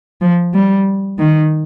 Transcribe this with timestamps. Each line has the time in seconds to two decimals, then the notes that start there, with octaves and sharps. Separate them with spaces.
0.22 F3
0.54 G3
1.19 D#3